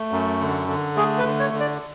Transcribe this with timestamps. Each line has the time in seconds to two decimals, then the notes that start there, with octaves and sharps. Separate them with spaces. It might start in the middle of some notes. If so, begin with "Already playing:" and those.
Already playing: A3
0.12 F#2
0.40 D3
0.68 D3
0.96 A3 G#4
1.18 B4
1.25 D3
1.40 C#5
1.53 D3
1.60 D5